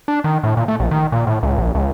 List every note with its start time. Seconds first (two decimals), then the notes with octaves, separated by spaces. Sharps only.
0.08 D4
0.24 D#3
0.43 A2
0.57 A#2
0.68 A3
0.80 A#1
0.91 D#3
1.12 A#2
1.27 A2
1.43 C#2
1.58 A#1
1.75 C#2